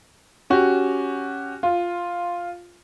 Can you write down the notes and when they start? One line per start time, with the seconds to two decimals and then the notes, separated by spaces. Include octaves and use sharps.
0.50 C#4 F#4 G4
1.63 F4